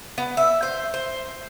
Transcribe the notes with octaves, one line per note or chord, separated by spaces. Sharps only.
B3
E5
C5
C5